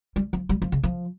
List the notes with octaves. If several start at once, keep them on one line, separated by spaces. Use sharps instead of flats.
G3
F3
G3
F3
C#3
F3